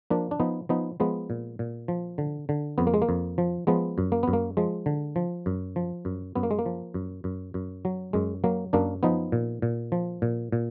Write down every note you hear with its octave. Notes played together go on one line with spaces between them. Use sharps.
F3 A#3 D4
D4
F3 B3 D#4
F3 B3 D#4
F3 G#3 B3
A#2
A#2
F3
D3
D3
F2 B3
A#3
G#3
A#3
F2
F3
F3 G#3 B3
F#2
A#3
F#2 B3
A#3
F3 G#3
D3
F3
F#2
F3
F#2
F#2 B3
A#3
G#3
A#3
F3
F#2
F#2
F#2
F#3
F#2 G#3
F#3 A#3
F#2 A#3 D4
F3 B3 D#4
A#2
A#2
F3
A#2
A#2